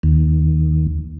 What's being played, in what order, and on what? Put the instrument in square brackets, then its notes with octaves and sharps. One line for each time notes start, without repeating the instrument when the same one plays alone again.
[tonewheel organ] D#2